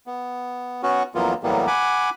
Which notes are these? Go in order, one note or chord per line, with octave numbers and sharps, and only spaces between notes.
B3
B3 C#4 F#4
F2 E3 F#3 A#3 B3 F4
A2 E3 F#3 G3 A#3 B3
F#5 G#5 B5 D6